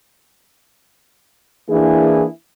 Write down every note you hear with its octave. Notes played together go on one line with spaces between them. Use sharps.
E3 A#3 D4 E4 G#4